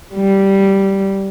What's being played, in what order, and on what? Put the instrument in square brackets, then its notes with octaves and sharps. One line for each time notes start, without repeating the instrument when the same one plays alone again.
[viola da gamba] G3